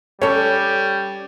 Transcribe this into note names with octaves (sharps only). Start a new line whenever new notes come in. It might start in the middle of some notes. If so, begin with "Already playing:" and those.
G3 C#4 A4 C#5